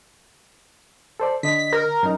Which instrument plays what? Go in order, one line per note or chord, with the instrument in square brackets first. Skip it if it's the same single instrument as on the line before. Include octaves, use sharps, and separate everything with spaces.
[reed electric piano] A4 C5 D5
[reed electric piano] D3 D#5 [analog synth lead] B6
[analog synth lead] A#4
[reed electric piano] F#2 D#4